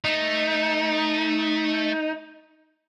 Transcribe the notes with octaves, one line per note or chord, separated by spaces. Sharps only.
A3 D#4